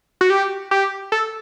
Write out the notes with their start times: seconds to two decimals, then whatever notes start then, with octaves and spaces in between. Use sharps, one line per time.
0.21 F#4
0.30 G4
0.71 G4
1.12 A4